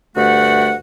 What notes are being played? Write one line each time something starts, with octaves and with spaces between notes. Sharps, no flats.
D2 G2 A3 F#4 F#5